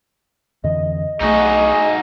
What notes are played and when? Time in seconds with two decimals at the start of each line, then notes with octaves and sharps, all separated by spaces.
0.64 F2 D3 E3 D#5
1.21 B1 A3 D#4 F#4 G#4